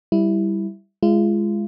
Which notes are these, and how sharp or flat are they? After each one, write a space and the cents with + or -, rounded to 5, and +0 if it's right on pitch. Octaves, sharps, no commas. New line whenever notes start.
G3 +0 E4 +0
G#3 +0 F4 -35